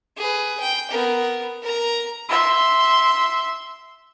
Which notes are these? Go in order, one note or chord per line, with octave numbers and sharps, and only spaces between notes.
G#4 B4
G5
B3 A#4
A#4 A#5
E5 C6